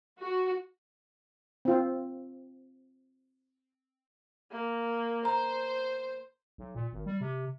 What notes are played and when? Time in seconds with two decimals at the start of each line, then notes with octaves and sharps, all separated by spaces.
0.20 F#4
1.65 C4 F4
4.51 A#3
5.25 C5 A#5
6.58 B1
6.75 A#2
6.93 G#1
7.06 G3
7.21 C3